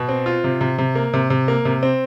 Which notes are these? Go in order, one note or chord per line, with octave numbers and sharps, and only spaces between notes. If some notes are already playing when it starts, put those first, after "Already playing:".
Already playing: B2
C4
F4
C3
C3
C3
A#3
C3
C3
A#3
C3
C4